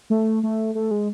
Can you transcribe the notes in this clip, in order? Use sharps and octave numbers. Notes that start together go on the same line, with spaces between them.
A3
A3
A3
G#3